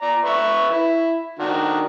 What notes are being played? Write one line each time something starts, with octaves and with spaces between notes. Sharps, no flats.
D5 A#5
B4 E5 C#6
E4
D#3 D4 F#4